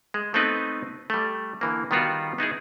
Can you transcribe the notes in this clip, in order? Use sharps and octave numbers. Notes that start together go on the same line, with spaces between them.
G#3
A3 B3 C4 D#4 B4
G3 A3
D3 E3 A#3
D#3 G3 B3 F4 F#4
B3 D#4 E4 G#4